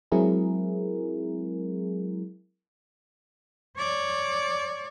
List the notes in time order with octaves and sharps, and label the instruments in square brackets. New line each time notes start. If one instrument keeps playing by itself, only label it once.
[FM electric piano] F#3 G#3 C4 E4 G#4 A#4
[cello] C#5 D5